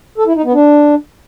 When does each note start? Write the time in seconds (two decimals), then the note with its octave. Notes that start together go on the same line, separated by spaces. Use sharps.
0.18 A4
0.27 E4
0.36 D#4
0.45 B3
0.53 D4